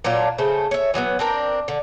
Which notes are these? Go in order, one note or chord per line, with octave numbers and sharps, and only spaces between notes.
A#2 F#3 D4 F4
C#3 A3 C5
C#5 E5
E3 F#3 G#3 B3
C4 D4 A#4
D3